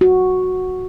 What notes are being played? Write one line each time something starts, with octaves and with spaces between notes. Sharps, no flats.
F#4